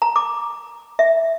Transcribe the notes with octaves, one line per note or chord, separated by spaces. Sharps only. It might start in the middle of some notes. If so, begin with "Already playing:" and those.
A#5
D6
E5